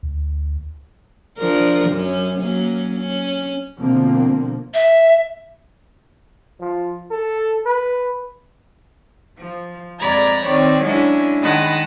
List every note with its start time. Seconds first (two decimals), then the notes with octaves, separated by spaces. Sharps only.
0.03 D2
1.38 F3 D4 A#4
1.88 F#2 C#4
2.39 F#3 A#3 C#4
3.00 C#4
3.81 B2 D3 F3 A#3 C4
4.74 E5
6.60 F3
7.11 A4
7.65 B4
9.39 F3
9.99 F2 G#3 D5 A#5 B5 G#6
10.44 D#3 C4 C#5 D5
10.82 F#3 G#3 C#4 D4 E4
11.41 D#3 G#3 D#5 F#5 A5 B5